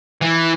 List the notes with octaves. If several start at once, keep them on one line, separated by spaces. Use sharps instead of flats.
E3